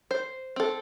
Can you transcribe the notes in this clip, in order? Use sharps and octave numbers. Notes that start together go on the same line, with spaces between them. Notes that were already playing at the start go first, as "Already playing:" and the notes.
C5
C4 A4